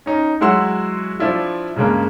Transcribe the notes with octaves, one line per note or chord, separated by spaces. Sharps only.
C#4 D#4
F#3 G#3 E4 F#4 C6 E6
F3 D4 E4 F4
G2 C#3 G#3 A#3